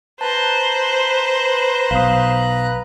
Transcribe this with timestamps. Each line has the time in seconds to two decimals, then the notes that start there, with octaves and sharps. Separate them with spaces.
0.21 B4 C5 A5 A#5 F#6
1.91 B1 F5 D#6